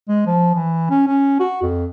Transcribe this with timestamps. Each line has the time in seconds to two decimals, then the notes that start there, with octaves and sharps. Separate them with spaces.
0.09 G#3
0.26 F3
0.55 E3
0.90 C#4
1.07 C#4
1.40 F#4
1.62 F2